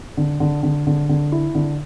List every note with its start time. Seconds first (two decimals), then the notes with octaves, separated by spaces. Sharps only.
0.17 D3
0.40 D3
0.63 D3
0.87 D3
1.09 D3
1.32 E4
1.55 D3